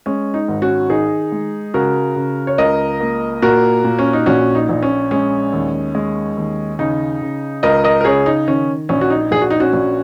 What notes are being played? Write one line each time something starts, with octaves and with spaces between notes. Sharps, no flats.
G#3 C#4
D#4
G#1
C#4 F#4
D#3 D#4 G#4
G#3
C#3 F#4 A#4
C#3
C#5
C#2 A#4 D#5
A#3
A#2 F#4 A#4
A#2
C#4
D#4
A#1 C#4 F#4
D#4
A#1
C#4
G#3 C#4
D#2
G#3
D#2
C#3 D#4
C#3
C#2 A#4 D#5
A#4 D#5
A#4
C#3 G#4 C#5
D#4
D#3 C#4
A#1 C#4
F#4
D#4
A#1 G#4
F#4
D#4
C#4 F#4
A#1